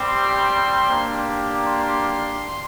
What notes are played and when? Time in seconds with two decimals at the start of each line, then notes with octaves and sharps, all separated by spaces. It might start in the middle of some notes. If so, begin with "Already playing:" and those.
Already playing: G3 C4 G4
0.09 C6
0.87 A#3 D4 G4
1.68 C6